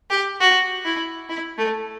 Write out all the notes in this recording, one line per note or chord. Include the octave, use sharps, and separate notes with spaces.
G4
F#4
E4
E4
A3